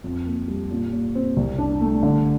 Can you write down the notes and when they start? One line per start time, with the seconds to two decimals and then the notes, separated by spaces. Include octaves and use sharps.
0.04 F2
0.26 A#3
0.48 G3
0.71 A#2
0.92 A#2
1.15 C4
1.36 C2
1.58 D4
1.81 A3
2.03 D3